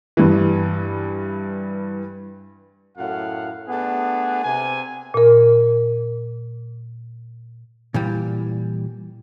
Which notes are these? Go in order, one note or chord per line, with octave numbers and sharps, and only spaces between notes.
G2 E3
F#2 A2 F5 F#5
A3 B3 D4 G#4
C3 G#5
A#2 A#4
A#2 E3 G3